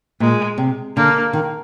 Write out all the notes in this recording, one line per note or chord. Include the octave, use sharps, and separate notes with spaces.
A#2 G#3
C3
D3 A#3
D#3